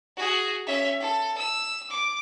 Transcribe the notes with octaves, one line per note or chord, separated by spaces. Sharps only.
F#4 G#4
C#4 E5
A4
E6
D6